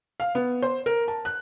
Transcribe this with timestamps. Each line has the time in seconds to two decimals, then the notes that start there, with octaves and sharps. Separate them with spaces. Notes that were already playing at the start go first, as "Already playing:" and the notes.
0.20 F5
0.35 B3
0.62 C5
0.86 A#4
1.08 A5
1.25 F#6